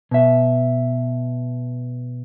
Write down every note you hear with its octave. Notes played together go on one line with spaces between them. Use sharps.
B2 E5